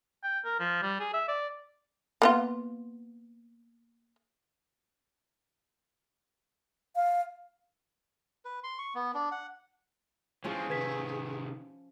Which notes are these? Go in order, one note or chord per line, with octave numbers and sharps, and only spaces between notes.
G5
A#4
F3
G3
G#4
E5
D5
A#3 B3 F4
F5
B4
C6
C#6
B3
D4
F#5
E3 F3 G#3 C4 C#4 F4 G#4
C3 D#3 B4 G#6 B6